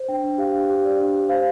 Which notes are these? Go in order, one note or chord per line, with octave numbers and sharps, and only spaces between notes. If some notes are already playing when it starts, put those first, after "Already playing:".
Already playing: C5
D4 G5
D4
G4 F5
D4
G4
D5
D4
G4
C5 F5